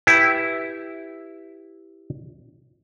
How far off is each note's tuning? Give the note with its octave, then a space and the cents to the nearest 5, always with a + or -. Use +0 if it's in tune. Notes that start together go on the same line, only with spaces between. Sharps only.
E4 +0 G4 +0 B4 +0